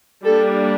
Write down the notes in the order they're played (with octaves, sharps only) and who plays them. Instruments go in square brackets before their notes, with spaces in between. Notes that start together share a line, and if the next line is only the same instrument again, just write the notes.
[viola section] G3 A#3 D4 A4